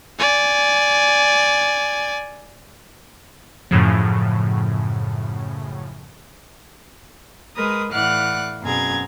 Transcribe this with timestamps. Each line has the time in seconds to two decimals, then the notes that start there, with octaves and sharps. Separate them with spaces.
0.19 D5 G#5
3.71 F#2 A2 C#3 F3
7.56 G#3 A#4 B4 D#6
7.92 A2 E3 D5 F5 F#5 F#6
8.62 F#2 B2 C4 G#4 A#5 G#6